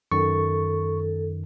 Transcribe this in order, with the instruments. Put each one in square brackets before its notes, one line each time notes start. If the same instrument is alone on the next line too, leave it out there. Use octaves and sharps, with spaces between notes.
[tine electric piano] F#2 D#3 [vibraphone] A4 [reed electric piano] C#6